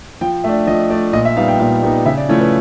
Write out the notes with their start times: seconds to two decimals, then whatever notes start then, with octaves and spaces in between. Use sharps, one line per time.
0.21 F3 G5
0.44 A3 D4 E5
0.67 F3 D#5
0.90 A3 D4 D5
1.13 A#2 D#5
1.25 E5
1.36 G3 B3 D#4 F5
1.48 G5
1.59 A#2 F5
1.83 G3 B3 D#4
2.05 C#3 E5
2.17 D5
2.29 F3 A3 C#4 E4 C#5
2.40 B4